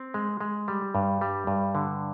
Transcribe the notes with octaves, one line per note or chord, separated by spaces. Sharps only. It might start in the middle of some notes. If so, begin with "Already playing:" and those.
Already playing: C4
G#3
G#3
G3
G2
G3
G2
D3